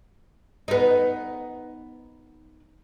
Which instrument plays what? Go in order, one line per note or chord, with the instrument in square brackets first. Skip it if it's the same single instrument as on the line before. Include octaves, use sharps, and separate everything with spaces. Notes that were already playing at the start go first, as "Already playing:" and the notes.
[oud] B3 D#4